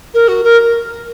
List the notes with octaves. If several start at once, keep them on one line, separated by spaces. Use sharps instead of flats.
A#4
F#4
A#4